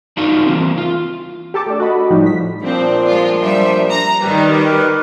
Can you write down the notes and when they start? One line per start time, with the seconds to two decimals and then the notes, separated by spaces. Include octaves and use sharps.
0.17 D4 D#4 F4 F#4 A#4
0.46 E3 A#3 C4
0.78 F4
1.54 G4 A4 A5 D6
1.66 A3 D4
1.80 F#4 A4 D#5 B5
2.10 A2 F3 G3 D#4
2.26 B6
2.62 A#2 F3 C4 D4
3.07 G#3 F4
3.39 G3 E5
3.90 A#5
4.20 D#3 G3 G4 B4 D5
4.50 G4 A#4 B4